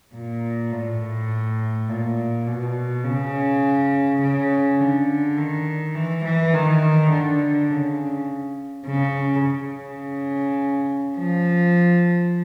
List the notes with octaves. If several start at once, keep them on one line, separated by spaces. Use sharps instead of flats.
A#2
A2
A#2
B2
C#3
C#3
D3
D#3
E3
E3
D#3
D3
C#3
C#3
C#3
F3